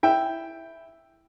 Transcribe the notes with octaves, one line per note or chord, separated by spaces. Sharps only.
E4 E5 G5